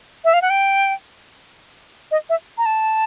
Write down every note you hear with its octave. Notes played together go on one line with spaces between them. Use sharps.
E5
F5
F#5
G5
D#5
E5
A#5
A5